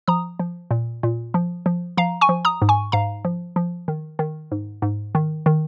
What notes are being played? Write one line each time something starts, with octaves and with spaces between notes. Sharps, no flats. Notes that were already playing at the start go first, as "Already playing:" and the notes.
F3 A#5 D#6
F3
A#2
A#2
F3
F3
F3 F5 A#5
G#5 C#6
F3
A#5 D#6
G#2
G#5 C#6
G#2 F5 A#5
F3
F3
D#3
D#3
G#2
G#2
D#3
D#3